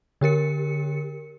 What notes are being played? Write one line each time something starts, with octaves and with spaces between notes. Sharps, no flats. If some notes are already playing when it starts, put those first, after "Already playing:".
D3 G4 A#4 C#7